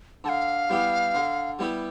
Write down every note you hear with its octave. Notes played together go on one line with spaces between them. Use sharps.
D3 F5 A5
G3 B3 E4 G4
D3
G3 B3 E4 G4